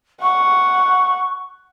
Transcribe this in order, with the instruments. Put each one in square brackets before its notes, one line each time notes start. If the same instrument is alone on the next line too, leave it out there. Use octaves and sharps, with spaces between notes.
[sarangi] F#5 [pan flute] C#6